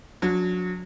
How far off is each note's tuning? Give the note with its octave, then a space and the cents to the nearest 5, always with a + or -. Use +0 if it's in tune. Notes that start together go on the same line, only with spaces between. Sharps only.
F#3 -30 D4 -35